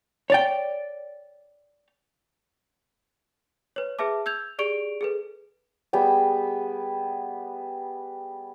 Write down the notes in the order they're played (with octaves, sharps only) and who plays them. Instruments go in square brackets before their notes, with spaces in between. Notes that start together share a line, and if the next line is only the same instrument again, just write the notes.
[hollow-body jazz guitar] C#5 D5 G5
[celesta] B4 C#5
G#4 B4 E5 A5 D6
E6 G6 G#6 F7
G4 G#4 D5 C#6 D7 F7
G#4 A4 B4
[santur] G3 B3 G#4 G5